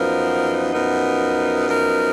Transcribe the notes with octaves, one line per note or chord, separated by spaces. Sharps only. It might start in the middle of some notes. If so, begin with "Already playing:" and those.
Already playing: F#2 F3 B3 D#4 A#4
F#2 F3 B3 D#4 A#4
F#2 F3 B3 D#4 A#4